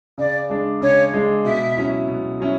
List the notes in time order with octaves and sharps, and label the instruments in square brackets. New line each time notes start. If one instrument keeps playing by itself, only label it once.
[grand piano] C#3 [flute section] D5
[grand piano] G#3 D4
[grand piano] C#3 [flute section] C#5
[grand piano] G#3 D4
[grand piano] B2 [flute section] E5
[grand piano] F#3 C#4 E4
B2
F#3 C#4 E4